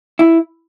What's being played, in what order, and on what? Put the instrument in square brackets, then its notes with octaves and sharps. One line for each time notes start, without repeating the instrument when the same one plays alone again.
[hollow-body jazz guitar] E4